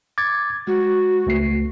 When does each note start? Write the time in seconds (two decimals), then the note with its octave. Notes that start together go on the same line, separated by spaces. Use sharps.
0.18 D6 G#6 A6
0.67 G#3 F#4
1.27 C#2 A3 C7